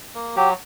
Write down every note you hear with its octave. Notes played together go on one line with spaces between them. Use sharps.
A#3
F#3 G4